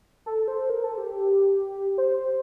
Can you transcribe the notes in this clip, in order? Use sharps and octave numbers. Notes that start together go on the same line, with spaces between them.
A4
C5
A#4
A4
G4
C5